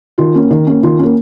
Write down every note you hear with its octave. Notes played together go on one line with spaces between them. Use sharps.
D#3 F4
A#3 C#4
D#3
A#3 C#4
D#3 F4
A#3 C#4